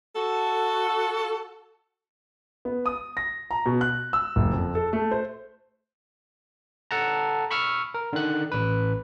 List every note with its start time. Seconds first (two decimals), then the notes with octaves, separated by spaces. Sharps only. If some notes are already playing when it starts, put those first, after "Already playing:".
0.16 F#4 A4
2.65 B3
2.86 D#6
3.17 A#6
3.51 A#5
3.66 B2
3.81 F#6
4.13 E6
4.36 F#1
4.53 F2
4.75 A4
4.93 A3
5.11 C5
6.91 A4 F#5 A5 A#5
7.51 B5 C#6 E6 F6
7.94 A#4
8.13 D3 D#3 F#6
8.52 A1 B4